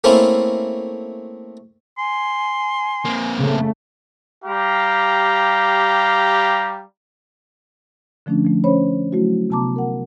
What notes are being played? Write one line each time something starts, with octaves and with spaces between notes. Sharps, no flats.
A3 A#3 C4 C#4 E4
G#5 C6
A#3 C4
C#3 A3
G3 G4 F5 A#5
D3 F3 A3 C#4 D4
F3 A3
C#4 C5 C#5 B5
F#3 A3 E4 F#4
C3 B3 A5 A#5 D6
A#4 F#5